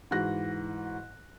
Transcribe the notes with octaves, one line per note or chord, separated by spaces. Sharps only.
G#2 E3 F#4 F#6 A#6